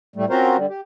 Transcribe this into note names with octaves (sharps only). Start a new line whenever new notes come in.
A2 G3 A3
C4 C#4 F4 F#4 A#4 C5
D3 G3
G4